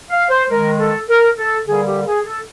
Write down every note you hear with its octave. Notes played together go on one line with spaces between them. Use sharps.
F5
C5
D#3 G#3 A#4
A4
A#4
A4
D3 G3 A#3 G#4
G4
G#4
A4